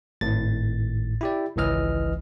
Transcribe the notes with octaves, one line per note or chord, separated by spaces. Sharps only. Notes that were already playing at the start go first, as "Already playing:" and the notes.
G#1 A2 A6
E4 G4 D5
G#1 C#2 E3 D#5 F6